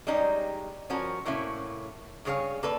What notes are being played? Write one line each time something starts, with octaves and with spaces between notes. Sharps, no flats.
G3 G#3 C#4 D#4 G4
F3 C#4 F#4 A#4
A2 C3 A#3 C#4 E4
G2 C#3 G#4 C#5 F5
A#3 A4 B4 D5